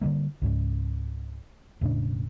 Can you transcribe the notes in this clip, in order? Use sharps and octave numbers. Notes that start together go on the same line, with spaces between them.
D3 F#3 G3 A#3
C#2 G#2 C#3
E1 A2 C#3 D4